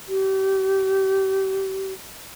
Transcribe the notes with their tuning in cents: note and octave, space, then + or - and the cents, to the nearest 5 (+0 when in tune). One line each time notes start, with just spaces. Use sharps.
G4 -30